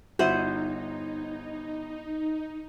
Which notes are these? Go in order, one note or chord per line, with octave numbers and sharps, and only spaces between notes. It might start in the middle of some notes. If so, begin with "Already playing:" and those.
G1 D#4 E4 F#4 C5 E5 F#5 D#7